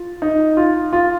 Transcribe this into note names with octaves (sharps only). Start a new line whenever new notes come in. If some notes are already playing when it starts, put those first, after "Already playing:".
Already playing: F4
D#4
F4
F4